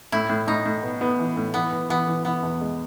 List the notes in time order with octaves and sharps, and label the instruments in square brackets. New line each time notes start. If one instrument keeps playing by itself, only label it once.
[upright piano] A2 [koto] E4
[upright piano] A2
[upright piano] A2 [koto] D#4
[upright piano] A2
B3
B3
E3
A2
[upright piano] E3 [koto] B3
[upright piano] E3
[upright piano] E3 [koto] B3
[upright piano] E3
[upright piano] E3 [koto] B3
[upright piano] E2
G#3